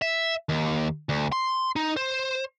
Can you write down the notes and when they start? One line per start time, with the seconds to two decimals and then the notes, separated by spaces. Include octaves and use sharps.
0.02 E5
0.49 D#2
1.09 D2
1.32 C6
1.76 D#4
1.97 C5